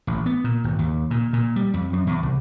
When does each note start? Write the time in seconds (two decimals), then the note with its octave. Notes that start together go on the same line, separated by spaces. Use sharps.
0.07 A1
0.26 B3
0.44 A#2
0.64 G#1
0.79 D#2
1.11 A#2
1.33 A#2
1.56 G3
1.74 F2
1.93 F#2
2.07 E2
2.23 C2